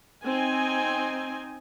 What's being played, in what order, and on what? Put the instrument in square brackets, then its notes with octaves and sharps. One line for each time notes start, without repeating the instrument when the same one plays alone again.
[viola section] C4 D#4 G#5